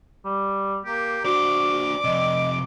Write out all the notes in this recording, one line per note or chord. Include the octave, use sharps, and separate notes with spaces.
G3
A#3 G4
D4 F#4 C5 D5 D6
F2 C3 D#5